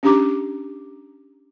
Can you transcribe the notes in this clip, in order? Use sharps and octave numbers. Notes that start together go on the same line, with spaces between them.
C#4 D4 G4 A#5 D6